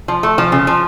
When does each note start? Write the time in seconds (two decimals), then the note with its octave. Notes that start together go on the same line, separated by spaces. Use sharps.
0.08 F3
0.23 A3
0.38 F3
0.52 C#3
0.67 F3